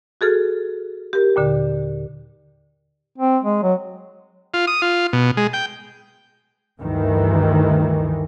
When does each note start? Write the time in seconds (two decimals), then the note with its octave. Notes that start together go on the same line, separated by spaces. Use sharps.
0.21 F#4 G#4 A4 F6
1.13 G4 A#4
1.36 D#2 A#2 D3
3.18 C4
3.43 G#3
3.63 F#3
4.54 F4
4.67 D#6
4.82 F4
5.13 B2
5.37 G#3
5.53 G5
6.80 D2 G2 D#3 E3